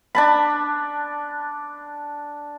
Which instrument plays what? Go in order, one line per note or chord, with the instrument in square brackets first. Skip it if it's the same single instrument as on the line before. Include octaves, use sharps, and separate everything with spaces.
[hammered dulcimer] D4 A5 B5